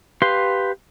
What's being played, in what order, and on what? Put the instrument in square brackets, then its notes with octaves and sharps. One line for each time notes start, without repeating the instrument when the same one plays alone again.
[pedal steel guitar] G4 B4 F5 C6